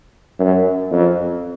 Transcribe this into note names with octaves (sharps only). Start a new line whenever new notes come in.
F#2
F2